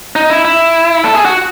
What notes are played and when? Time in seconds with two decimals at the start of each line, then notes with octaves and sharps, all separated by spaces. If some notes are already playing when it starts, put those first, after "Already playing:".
0.16 D#4
0.30 E4
0.45 E4
1.04 A4
1.15 G#4
1.25 F#4